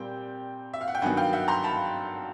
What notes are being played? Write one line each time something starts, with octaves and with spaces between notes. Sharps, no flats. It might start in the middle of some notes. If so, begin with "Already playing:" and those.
Already playing: A#2 G3 C4 G5
E5
F5
F#5
G5
G2 D#3 F#3 B3 F#5 G#5
F5 G5
E5 F#5
A#5 C6
A5 B5